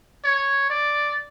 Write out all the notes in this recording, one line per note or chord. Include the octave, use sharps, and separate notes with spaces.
C#5
D5